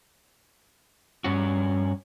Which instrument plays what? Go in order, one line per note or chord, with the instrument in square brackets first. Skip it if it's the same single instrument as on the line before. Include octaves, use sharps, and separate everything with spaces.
[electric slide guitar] G2 C#4 F#4